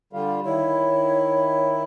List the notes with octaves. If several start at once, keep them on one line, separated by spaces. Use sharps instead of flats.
D3 G3 F4
D#3 E4 C#5